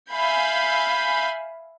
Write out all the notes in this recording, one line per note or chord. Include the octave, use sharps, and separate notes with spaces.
E5 F5 G#5 B5 G6